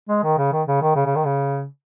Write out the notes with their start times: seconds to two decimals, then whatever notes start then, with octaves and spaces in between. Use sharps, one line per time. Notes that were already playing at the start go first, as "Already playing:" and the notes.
0.09 G#3
0.24 D#3
0.38 C#3
0.52 D#3
0.67 C#3
0.82 D#3
0.95 C#3
1.06 C#3
1.15 D#3
1.25 C#3